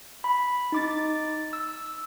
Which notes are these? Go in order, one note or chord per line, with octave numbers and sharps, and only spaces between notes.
B5
D#4 D6 A6
E6